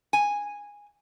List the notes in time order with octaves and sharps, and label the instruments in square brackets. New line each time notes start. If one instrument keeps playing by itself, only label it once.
[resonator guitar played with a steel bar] G#5